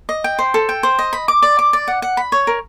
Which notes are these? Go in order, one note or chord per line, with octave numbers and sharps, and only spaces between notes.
D#5
G5
C5
A4
G5
C5
D#5
B5
D6
D5
D6
D5
F#5
F#5
B5
C#5
A#4